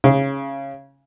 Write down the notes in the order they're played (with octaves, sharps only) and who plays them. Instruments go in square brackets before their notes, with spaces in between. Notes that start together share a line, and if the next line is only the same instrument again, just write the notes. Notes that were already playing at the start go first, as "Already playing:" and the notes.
[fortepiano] C#3